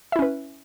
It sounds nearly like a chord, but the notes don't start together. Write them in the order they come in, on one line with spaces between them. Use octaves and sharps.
E5 E4 C#4 B4